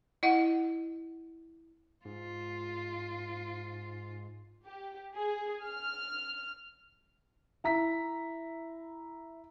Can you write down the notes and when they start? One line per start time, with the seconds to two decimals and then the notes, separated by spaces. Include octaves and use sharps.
0.23 E4 D#5 F#5
2.05 G#2 F4
4.67 G4
5.16 G#4
5.64 F6
7.64 E4 A#5 B6